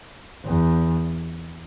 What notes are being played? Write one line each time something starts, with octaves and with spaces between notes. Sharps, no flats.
E2